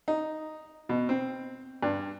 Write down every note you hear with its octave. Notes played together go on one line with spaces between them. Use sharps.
D#4
B2
C4
G2